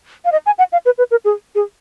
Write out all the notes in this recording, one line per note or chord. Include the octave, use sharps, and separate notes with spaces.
F5
D#5
G#5
F#5
F5
B4
B4
A#4
G#4
G#4